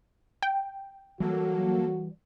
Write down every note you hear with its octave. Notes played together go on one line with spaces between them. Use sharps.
G5
E3 F#3 G3 A#3 F#4 A4